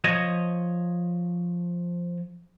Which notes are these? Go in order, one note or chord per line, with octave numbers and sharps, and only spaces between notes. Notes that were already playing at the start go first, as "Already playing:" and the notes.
F3 C#5 D#5